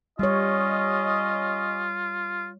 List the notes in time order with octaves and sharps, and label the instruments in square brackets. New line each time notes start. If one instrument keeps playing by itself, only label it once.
[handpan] G3 C#5 [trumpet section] C#4 D#5 [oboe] F4